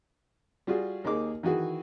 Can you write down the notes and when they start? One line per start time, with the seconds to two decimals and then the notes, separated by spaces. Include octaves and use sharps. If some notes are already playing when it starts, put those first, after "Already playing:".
0.67 G3 F4 F#4 G#4
1.04 D#2 A#3 D#4 G#4 D6
1.43 D#3 E3 F#4 G#4